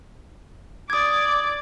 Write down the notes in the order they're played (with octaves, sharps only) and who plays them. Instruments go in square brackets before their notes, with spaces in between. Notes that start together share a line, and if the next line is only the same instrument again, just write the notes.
[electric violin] D5 D6 [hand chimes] D#6 G#6